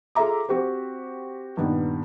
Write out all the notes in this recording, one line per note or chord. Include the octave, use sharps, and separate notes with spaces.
F4 G#4 A4 E5 A#5 D6
C4 F#4 G4 C5
G2 A#2 D#3 B3